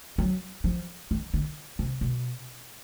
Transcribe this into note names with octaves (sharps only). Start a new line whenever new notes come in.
F#3
F3
D#3
D3
C3
B2